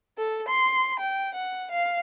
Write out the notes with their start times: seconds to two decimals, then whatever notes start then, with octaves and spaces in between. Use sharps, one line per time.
0.18 A4
0.49 C6
0.99 G5
1.35 F#5
1.71 F5